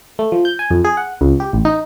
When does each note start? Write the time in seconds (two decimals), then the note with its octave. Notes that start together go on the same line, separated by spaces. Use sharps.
0.19 A3
0.32 F3
0.45 G6
0.59 G#5
0.71 F2
0.85 G#4
0.97 F#5
1.21 C#2
1.40 G4
1.53 A1
1.65 D#4